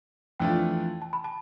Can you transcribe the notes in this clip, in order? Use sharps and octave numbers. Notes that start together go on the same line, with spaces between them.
F2 E3 A3 D4 F4 G5
A5
B5
A5